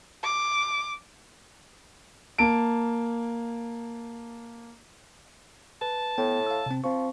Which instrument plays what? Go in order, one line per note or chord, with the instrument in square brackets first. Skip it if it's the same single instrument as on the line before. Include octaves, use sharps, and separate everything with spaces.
[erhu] D6
[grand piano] A#3 A5 D7
[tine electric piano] B4 [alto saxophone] A5
[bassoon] A2 [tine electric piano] B3 G5
[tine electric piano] F5 E6
C3 C4
[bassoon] F3 [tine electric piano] C4 C#6